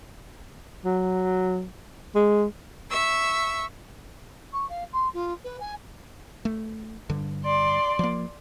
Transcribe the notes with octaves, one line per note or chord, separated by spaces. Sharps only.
F#3
G#3
E5 C#6 E6
C#6
F5
C6
F4
B4
G#5
A3
G2 D3
D5 C6
F3 A#3